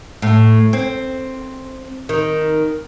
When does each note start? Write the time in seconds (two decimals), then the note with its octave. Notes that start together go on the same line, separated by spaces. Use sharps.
0.22 A2
0.73 C4
2.09 D#3